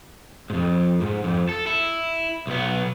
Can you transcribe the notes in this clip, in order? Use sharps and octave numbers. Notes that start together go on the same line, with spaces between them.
F2 G#2
G#2
F2
A4
E4
B1 B3